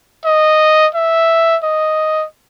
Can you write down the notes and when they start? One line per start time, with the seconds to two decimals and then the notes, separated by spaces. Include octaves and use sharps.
0.25 D#5
0.95 E5
1.63 D#5